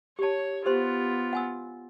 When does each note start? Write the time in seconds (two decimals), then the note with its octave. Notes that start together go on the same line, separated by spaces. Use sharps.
0.19 G4 C#5 A5
0.66 B3 F4 G4 C5 C6
1.33 F#5 G#5 E6